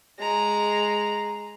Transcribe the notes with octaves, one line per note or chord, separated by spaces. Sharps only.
G#3 A#5